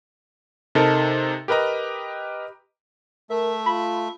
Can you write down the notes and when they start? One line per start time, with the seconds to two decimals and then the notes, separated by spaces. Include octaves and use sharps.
0.75 C3 D#4 A4 A#4
1.48 G4 A#4 B4 D#5 A#5
3.30 A3 A#4 E5
3.66 F4 B5